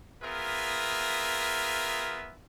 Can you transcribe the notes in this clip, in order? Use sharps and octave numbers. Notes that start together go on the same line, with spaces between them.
B3 F4 G#4 A#4 E5